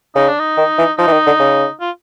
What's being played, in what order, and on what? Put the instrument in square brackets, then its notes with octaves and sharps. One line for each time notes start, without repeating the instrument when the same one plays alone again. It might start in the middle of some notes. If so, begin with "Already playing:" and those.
[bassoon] C#3 [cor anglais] D#4
[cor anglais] D4
D#4
[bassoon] D#3
E3
[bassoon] F3 [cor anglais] D#4
[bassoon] E3
D#3
D3
C#3
[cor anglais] F4